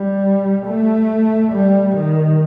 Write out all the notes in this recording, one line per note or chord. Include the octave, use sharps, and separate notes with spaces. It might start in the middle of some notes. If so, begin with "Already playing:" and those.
Already playing: G3
A3
G3
D#3